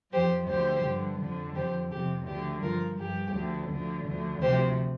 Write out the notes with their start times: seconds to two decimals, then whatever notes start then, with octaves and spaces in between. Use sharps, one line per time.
0.12 F2 F3 G4 C5
0.48 D2 D3 F3 G4 C5
0.84 G2 D3 F3
1.20 F2 D3 F3
1.55 F2 D3 F3 G4 C5
1.91 F2 C3 F3 G4
2.27 D2 D3 F3 G4
2.62 G2 F3 F4 A#4
2.98 G2 F3 G4
3.34 D2 D3 F3
3.69 D2 D3 F3
4.06 D2 D3 F3
4.41 D2 C3 F3 G4 C5